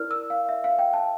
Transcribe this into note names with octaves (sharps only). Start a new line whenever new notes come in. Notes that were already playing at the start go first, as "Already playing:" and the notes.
Already playing: E4 A#4 D5 F6
E6
F5
E5
F5
G5
A5